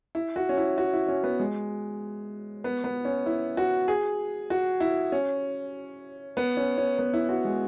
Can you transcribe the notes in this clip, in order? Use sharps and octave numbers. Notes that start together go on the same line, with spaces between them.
E4
F#4
C#4
E4
F#4
E4
C#4
B3
G#3
B3
B3
C#4
E4
F#4
G#4
F#4
E4
C#4
B3
C#4
C#4
B3
E4
F#4
G#3